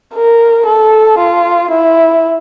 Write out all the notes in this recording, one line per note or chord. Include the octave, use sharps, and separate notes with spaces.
A#4
A4
F4
E4